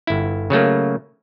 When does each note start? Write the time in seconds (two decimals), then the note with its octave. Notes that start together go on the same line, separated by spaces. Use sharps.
0.07 G1 E4
0.50 C#3 F#3 A3 A#3